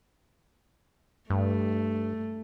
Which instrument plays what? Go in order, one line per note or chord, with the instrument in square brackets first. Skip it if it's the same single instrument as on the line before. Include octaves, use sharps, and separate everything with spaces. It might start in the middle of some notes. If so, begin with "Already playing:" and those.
[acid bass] G2 [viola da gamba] A3